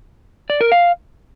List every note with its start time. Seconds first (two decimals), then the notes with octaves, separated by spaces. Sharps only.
0.50 D5
0.61 A#4
0.72 F5